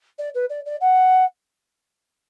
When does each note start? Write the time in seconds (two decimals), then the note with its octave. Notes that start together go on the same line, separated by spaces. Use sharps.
0.19 D5
0.34 B4
0.50 D5
0.66 D5
0.81 F#5